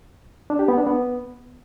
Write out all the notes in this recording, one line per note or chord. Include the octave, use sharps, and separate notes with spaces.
D4
G4
B3
D4
B3